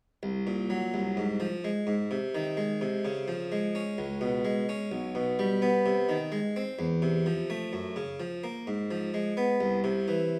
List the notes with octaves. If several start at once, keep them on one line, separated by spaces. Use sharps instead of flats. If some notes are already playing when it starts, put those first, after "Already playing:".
C2
A#2
F#3
C2
G#2
F3
G#3
G#2
C3
D#3
G#3
C3
C#3
F3
G#3
C#4
C#2
B2
G#3
C#4
B1
B2
G3
B3
C3
D#3
G#3
C4
E2
C3
F3
A3
F#2
C#3
F3
A#3
G#2
F3
G#3
B3
C2
C3
E3